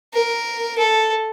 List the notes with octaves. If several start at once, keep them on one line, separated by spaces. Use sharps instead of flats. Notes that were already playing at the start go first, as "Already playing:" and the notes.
A#4
A4